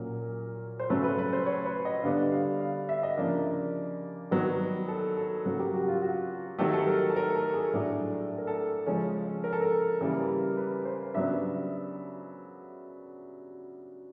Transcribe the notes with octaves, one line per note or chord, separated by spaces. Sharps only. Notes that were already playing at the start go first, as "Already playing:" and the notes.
Already playing: A#2 F#3 A#3 C#4 A#4
C5
C#3 F#3 A3 C#4 B4
B4
B4
C5
C#5
B4
D#5
D3 G3 B3 D4 F5
F5
F5
E5
D#5
C#3 F3 A#3 D4 D5
D#3 F#3 B3
A4
A4
C#3 F#3 A#3
G4
F#4
F4
F#4
D#3 F#3 A3 G4
A4
A#4
A4
A#4
A4
G#4
A2 F#3 A3 D4
A4
A#4
A4
C#3 F3 G#3 C#4
A#4
A4
A#4
C#3 E3 G3 A#3
B4
C5
C#3 F#3 B3 D4 E5